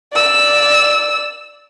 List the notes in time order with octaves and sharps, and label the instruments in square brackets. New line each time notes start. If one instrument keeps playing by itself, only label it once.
[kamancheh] D5 E6